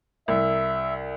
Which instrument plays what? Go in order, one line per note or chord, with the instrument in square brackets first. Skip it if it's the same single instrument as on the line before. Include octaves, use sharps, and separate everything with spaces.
[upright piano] C2 [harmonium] E5